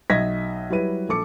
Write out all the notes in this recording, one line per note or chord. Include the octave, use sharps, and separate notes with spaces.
B1 D#5 E5 G#6 A#6 B6
F#3 G3 E4 B4 D#7
A#1 A4 D6 C#7